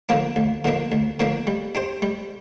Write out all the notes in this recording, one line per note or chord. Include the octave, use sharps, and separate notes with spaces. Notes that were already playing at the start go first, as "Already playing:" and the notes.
D3 F3 A#3 D4
D2
D3 F3 A#3 D4
D2
D3 F3 A#3 D4
G3
D4 G4 C5
G3